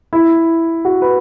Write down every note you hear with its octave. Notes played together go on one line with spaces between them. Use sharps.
E4
F#4
B4